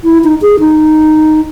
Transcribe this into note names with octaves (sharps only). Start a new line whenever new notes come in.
E4
D#4
G#4
D#4